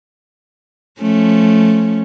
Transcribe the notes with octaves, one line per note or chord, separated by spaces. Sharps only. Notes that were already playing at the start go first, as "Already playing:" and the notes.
F3 A3 C#4